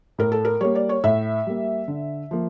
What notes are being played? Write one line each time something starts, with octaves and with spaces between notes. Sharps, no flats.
A2 A#4
A4
A#4
G3 A#3 C#5
D5
C#5
A2 E5
G3 A#3
D3
F3 A#3